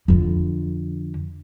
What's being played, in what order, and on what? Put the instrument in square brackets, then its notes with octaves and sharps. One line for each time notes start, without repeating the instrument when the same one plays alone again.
[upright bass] F2 D3